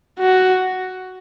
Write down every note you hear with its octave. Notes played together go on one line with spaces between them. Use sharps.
F#4